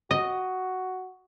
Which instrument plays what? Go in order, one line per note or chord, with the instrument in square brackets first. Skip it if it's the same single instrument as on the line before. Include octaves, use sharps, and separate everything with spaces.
[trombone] F#4 [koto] D#5